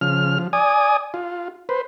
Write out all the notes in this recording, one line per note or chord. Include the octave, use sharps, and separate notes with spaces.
C#3 F3 F6
F3
D5 G#5 D#6
F4
B4 C5